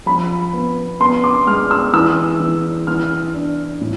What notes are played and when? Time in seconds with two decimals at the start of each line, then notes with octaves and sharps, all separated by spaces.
0.06 F3 B5
0.53 B3
1.00 B3 C6
1.24 D6
1.47 G#3 F6
1.71 E6
1.93 E3 E6
2.40 E3
2.87 E3 F6
3.34 D4
3.81 A2